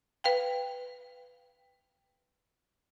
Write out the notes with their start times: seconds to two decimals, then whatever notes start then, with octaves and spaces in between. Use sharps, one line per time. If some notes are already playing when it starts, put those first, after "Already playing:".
0.24 B4 F5 G5